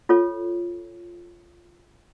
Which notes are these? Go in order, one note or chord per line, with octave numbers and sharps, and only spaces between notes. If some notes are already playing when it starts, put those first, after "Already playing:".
F4 A4 C#5